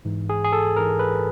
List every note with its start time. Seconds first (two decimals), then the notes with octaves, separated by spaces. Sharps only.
0.05 G#2 E3
0.29 G#4
0.44 G#4
0.53 A4
0.76 G#2 E3 A#4
0.99 B4